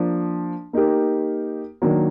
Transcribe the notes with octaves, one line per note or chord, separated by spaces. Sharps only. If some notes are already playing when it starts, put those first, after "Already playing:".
Already playing: F3 A#3 D4
A#3 D#4 G4 A#4
D#3 F#3 A#3 D4